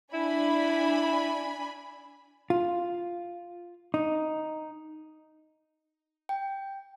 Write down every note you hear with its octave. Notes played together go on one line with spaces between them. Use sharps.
D4 E4 G#5 B5
F4
D#4
G5